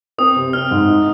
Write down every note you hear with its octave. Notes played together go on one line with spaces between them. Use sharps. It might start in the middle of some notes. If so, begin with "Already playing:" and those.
C4 D#6
C3
C4 F6
G#2
D#4